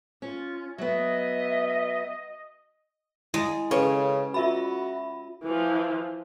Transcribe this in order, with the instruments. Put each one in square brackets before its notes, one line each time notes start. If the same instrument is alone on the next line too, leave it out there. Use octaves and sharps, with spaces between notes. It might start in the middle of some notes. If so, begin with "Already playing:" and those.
[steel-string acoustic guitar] C#4 [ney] F4
[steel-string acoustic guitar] F#3 B3 [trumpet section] D#5 [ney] E5
[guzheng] G#3 [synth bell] E4
[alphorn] C#3 [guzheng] C#4 [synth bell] A4 B4
[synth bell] F4 E5 B5 [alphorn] F#4
[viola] E3 F3